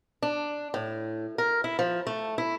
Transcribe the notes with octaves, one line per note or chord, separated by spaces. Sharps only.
D4
A2
A#4
E4
F3
A3
E4